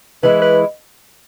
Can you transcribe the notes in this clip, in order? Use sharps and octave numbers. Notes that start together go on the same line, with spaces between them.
E3 G#3 E4 B4
B4